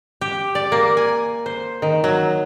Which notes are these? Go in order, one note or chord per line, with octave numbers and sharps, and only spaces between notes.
G4
D5
A#3
G#5
C5
D#3
F#3